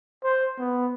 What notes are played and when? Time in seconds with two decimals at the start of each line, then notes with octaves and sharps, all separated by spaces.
0.24 C5
0.59 B3